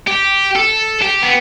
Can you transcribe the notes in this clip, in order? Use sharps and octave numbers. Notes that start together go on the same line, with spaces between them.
G4
A4
G4
B3